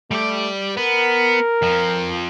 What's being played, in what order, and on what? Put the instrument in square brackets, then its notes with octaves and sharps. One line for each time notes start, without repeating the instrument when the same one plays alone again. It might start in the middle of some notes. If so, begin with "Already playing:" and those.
[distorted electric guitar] G3 D5 [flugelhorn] A3
[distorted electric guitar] B3 [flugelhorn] A#4
[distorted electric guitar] F2 F3